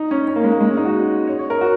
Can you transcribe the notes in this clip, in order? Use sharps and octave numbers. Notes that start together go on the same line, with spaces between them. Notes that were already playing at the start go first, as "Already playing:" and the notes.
Already playing: D#4
C#4
C#4
A#3
G#3
A#3
G#3
C#4
D#4
F#4
C#5
C#5
A#4
F#4